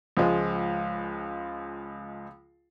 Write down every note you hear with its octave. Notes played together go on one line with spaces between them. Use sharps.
C#2 F3 G#3